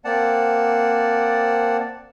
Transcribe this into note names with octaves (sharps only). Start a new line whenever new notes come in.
A#3 C4 D5 F#5 A5